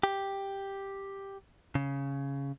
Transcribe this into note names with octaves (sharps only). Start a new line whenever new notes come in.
G4
C#3